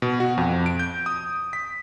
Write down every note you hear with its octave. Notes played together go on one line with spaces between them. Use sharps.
B2
F#4
F2
D7
G6
D#6
B6